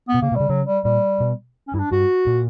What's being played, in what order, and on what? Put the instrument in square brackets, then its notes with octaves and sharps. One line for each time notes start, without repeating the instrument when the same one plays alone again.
[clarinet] B3
[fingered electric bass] B2
[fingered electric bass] C#3 [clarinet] A#3
[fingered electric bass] B2
[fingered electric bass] C#3 [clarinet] G3
[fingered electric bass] C#3 [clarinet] F#3
[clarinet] G3
[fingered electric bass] A#2 [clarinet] G3
[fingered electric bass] B2
[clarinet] C#4
[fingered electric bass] G2 [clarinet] E4
[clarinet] D4
[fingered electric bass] G2 [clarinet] F#4
[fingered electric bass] A#2